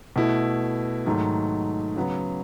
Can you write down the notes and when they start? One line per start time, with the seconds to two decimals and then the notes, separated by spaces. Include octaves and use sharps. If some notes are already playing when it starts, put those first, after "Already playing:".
0.16 B2 A3 E4
1.06 G#2 D#3 F#3 A3
1.96 C#3 F#3 B3